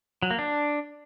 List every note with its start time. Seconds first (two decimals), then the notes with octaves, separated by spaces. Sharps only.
0.22 F#3
0.31 A#3
0.39 D4